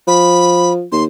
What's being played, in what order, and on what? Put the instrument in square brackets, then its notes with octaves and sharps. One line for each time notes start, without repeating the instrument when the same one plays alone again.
[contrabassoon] F3 [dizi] B5
[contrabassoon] D#2 [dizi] C6